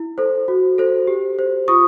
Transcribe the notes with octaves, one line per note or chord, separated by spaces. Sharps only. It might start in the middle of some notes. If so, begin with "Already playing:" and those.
Already playing: E4
A4 C5
F#4
A4 C5
G4
C5
F4 C#6 D#6